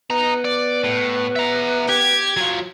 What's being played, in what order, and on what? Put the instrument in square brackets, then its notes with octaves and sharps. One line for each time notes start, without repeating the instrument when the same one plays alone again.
[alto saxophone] B3 [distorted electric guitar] D#5 A#5
[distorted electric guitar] D5
A2
E5 A#5
[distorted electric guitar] G4 [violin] G#6
[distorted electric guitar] F#3 F4